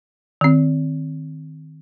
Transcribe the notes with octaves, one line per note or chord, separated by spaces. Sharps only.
D#3 C4